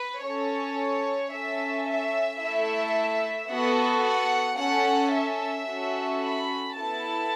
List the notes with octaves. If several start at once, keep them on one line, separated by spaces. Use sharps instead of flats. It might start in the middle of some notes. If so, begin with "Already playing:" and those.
Already playing: B4
C#4 A4 C#5
C#4 A4 E5
E5
A3 E4 A4 E5
B3 F#4 A4 F#5
F#5
C#4 A4 F#5
E5
C#4 F#4 A4
B5
B3 E4 A4 A5